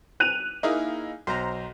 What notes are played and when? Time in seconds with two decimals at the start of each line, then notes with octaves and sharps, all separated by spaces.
0.20 F#6 D#7 F7
0.63 A#3 D#4 E4 G#4 F5
1.27 B1 C5 A#5